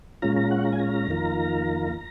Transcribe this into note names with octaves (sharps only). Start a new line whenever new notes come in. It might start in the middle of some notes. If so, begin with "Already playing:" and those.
A#2 G#3 C#4 F4 A#5
A#5
F#5
A#5
G#5
A#5
F2 D#3 A#3 F4